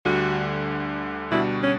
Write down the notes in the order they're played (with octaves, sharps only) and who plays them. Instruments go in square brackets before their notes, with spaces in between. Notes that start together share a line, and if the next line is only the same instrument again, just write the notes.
[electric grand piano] D2 D3 G3 [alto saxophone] F#4
[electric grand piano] B2 G3 D4 F#4 [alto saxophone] E4
[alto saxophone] C#4